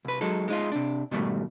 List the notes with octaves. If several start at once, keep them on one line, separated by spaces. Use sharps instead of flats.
C2 B4
F#3 G#3 D#4 A4
G#3 D#4 F4
C3 D4
G#2 B2 D#3 G3 A3